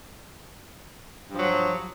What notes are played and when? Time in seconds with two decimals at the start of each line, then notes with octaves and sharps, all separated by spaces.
1.29 G2
1.33 F3
1.37 F#3